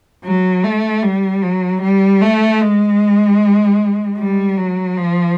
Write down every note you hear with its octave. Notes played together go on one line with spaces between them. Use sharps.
F#3
A3
G3
F#3
G3
A3
G#3
G3
F#3
F3